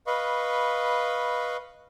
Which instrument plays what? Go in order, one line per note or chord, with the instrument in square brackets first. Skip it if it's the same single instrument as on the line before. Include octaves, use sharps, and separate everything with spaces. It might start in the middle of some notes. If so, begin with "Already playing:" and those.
[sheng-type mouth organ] B4 D#5 F5 B5 C#6